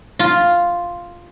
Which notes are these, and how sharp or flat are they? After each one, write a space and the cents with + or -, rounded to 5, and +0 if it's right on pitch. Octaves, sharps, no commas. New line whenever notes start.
F4 +0 A#5 +0